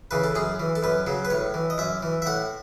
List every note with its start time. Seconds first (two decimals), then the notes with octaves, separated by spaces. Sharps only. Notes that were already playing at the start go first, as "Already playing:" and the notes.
0.11 C#3 E3 B4
0.24 A4
0.35 F#2 G#4
0.60 E3
0.75 A4
0.83 F#2 B4
1.07 C#3 F#3
1.25 B4
1.30 A2 C#5
1.54 E3
1.70 D#5
1.78 F#2 E5
2.03 E3
2.22 E5
2.26 A2 F#5